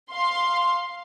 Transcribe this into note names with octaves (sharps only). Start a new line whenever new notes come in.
F5 C6